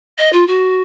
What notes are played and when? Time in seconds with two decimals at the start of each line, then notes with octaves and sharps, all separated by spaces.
0.18 D#5
0.32 F4
0.47 F#4